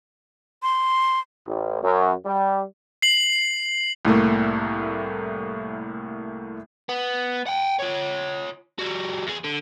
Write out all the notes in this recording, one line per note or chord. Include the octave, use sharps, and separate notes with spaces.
C6
A1
F#2
G3
C7 F#7
C2 A2 A3 A#3
B3
F#5 G5
F4 C#5
G3 F#4
E2 G#4
D3